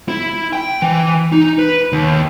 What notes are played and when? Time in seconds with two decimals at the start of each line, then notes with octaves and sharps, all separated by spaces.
0.08 E4
0.53 G5
0.82 E3
1.32 D#4
1.59 B4
1.92 D#2